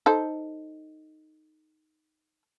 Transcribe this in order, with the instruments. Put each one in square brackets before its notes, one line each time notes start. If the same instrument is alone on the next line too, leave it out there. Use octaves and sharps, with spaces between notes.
[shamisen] D#4 A4 C5